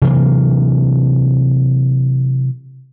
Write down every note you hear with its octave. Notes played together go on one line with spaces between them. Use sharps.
C3 E3 F#3 A#3